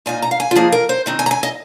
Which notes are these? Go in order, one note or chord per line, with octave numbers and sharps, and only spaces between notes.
A#2 A#3 D#4 G#5
A#5
F5
G#5
F4
F3 A#3 D#4 G#4
A#4
C5
D#3 C4 D#4
G#5
A#5
G#5
D#5